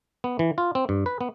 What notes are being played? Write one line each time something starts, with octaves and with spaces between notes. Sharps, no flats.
B3
E3
F4
C4
G2
B4
B3